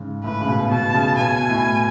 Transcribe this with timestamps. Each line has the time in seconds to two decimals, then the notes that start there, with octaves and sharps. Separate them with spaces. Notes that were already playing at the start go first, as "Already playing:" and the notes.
Already playing: G#2 C#3
0.24 A2 B4
0.41 C#3
0.48 B2
0.71 B2 A5
0.94 C#3
1.18 B2 G#5
1.49 A2